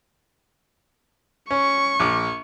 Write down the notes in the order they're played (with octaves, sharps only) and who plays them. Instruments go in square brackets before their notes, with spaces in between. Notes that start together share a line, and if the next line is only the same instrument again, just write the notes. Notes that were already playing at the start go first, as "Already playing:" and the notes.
[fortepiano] C#4 [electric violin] C#6
[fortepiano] A#1 D6